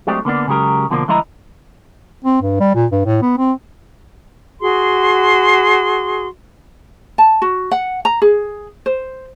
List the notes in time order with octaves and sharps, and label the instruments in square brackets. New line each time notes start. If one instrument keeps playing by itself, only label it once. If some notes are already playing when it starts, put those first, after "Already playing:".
[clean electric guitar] F#3 G#3 A3 C4 D4 G4
D3 A#3 B3 D4
C#3 F#3 G#3 G4 A#4
B2 D3 F3 A#3 D4
D3 F3 G#3 E4 D#5 A#5
[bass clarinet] C4
G2
G3
A#2
G2
A2
B3
C4
[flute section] F#4 G#4 C6
[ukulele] A5
F#4
F#5
A#5
G#4
C5